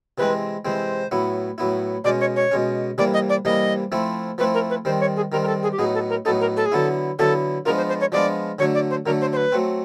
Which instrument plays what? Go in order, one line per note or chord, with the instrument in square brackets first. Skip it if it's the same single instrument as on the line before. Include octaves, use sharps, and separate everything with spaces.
[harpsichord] C3 E3 G#3 C4 [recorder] B4
[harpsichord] C3 E3 G#3 C4 [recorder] C5
[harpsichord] A2 F#3 B3 E4
A2 F#3 B3 E4
[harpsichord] B2 G#3 C#4 [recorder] D5
[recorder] C#5
C#5
[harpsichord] B2 G#3 C#4
[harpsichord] C3 E3 G3 A#3 [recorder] D5
[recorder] D#5
D5
[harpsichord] C3 E3 G3 A#3 [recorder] D#5
[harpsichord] F3 A3 C4 E4
[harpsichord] F3 A3 C4 E4 [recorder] B4
[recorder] A#4
B4
[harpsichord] D#3 G3 C4 [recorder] C5
[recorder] C#5
G#4
[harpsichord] D#3 G3 C4 [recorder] A#4
[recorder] A#4
A4
G#4
G4
[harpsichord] A2 F#3 B3 D#4 [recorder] G#4
[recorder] A4
A#4
[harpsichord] A2 F#3 B3 D#4 [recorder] A4
[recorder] A#4
A4
G#4
[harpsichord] D3 F#3 B3 E4 [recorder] A4
[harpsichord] D3 F#3 B3 E4 [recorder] A4
[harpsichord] F3 G#3 B3 D4 F4 [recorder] A#4
[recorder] C5
C5
C#5
[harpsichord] F3 G#3 B3 D4 F4 [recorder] D5
[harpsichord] D3 F#3 A3 D4 [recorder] C#5
[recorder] D5
C5
[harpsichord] D3 F#3 A3 D4 [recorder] A#4
[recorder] C5
C5
B4
[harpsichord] F#3 A3 C4